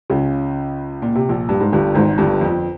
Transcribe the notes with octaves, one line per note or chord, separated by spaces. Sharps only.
C#2 C#3
A#2
C3
A#1 A#2
G2
G#2
G1 G2
G#1 G#2
G1 G2
F2